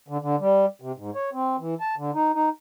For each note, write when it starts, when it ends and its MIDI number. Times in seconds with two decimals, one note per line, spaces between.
0.08 0.17 50
0.21 0.36 50
0.40 0.66 55
0.82 0.92 48
0.97 1.10 44
1.15 1.30 73
1.33 1.56 60
1.58 1.75 52
1.81 1.95 81
1.97 2.11 50
2.15 2.32 63
2.35 2.49 63